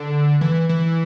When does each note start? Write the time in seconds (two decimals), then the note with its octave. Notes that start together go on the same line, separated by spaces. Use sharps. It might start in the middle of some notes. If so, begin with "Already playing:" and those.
Already playing: D3
0.41 E3
0.69 E3